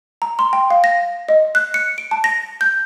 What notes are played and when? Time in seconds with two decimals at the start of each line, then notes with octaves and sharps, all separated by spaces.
0.22 A#5
0.39 C6
0.53 G5
0.70 F5
0.84 A#6
1.29 D#5
1.55 F#6
1.74 C#7
1.98 D7
2.11 A5
2.24 A#6
2.61 G6